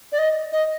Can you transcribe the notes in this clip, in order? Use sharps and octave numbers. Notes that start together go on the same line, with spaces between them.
D5
D#5
D#5